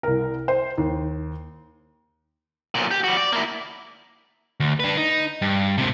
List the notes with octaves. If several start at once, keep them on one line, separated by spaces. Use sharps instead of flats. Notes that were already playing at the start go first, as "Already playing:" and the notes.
C2 A#4
C5
D#2
B1 A#2
G4
G3 F#4
D5
A#3 E4
D2
D4 B4
D#4
G2
G#2 C3